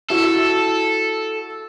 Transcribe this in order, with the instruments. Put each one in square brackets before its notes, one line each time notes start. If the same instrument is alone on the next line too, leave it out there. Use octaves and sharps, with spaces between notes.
[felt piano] E4 F#4 E6 [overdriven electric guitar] A4